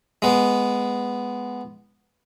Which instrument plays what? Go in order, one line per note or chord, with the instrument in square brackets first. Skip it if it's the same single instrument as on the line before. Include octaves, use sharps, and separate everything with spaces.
[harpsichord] G#3 B3